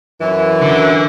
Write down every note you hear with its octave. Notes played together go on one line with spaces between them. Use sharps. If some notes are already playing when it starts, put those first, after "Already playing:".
F#2 E3
D3